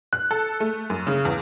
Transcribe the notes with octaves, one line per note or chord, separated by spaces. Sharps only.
F#6
A4
A3
F#2
C#3
E2